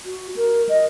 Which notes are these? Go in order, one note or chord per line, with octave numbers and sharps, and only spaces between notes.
F#4
A#4
D#5